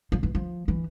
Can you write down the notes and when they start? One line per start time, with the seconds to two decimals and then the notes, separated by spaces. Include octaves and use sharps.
0.12 F3
0.23 E3
0.35 F3
0.68 E3